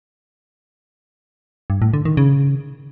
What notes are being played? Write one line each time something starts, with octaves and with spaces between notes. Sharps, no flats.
G2
A2
D3
D#3
C#3